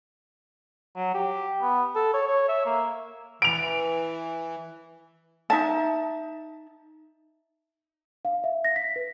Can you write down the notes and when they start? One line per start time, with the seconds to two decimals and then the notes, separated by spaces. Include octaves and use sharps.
0.96 F#3
1.14 G4
1.61 B3
1.96 A4
2.14 C#5
2.27 C#5
2.48 E5
2.66 A#3
3.42 E3 D7 F7
5.50 D#4 E5 A5
8.25 F5
8.44 E5
8.65 A#6
8.76 B6
8.96 B4